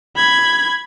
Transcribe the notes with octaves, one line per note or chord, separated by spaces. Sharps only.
B5 G#6